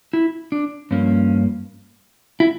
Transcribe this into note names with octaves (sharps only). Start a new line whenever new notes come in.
E4
D4
G2 F3 A#3 C#4
E4